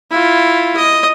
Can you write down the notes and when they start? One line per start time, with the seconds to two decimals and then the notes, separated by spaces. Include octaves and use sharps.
0.11 E4 F4
0.77 D#5